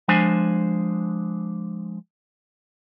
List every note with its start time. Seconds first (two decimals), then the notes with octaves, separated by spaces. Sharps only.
0.08 F3 G#3 D4 C5 G#5